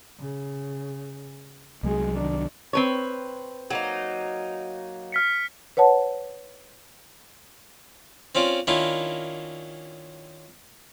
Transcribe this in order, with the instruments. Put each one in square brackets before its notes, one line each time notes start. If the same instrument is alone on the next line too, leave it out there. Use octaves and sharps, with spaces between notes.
[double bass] C#3
[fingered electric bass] C2 F#3 [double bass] G#3
[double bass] D#3 D4
[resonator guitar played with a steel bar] C4 B4 C#5
[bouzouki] F#3 A#3 D#4
[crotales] F6 B6 C#7
[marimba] B4 C#5 F#5 A5
[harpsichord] C4 C#4 F4 D5
D#3 A#3 C#4 D4 E4 F4